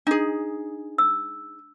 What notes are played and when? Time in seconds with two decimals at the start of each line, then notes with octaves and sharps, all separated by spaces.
0.07 D4 D#4 G#4
0.98 E6